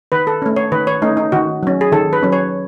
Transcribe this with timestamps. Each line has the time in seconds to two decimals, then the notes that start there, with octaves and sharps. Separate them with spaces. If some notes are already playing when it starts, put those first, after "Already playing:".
0.12 D#3 B4
0.27 A4
0.42 A3 C#4
0.56 C#5
0.72 D#3 B4
0.87 C#5
1.02 A3 C#4 D#4
1.17 D#4
1.32 D#3 F#4
1.63 F#3 C#4
1.81 G#4
1.92 D#3 A4
2.13 B4
2.22 F#3 C#4
2.32 C#5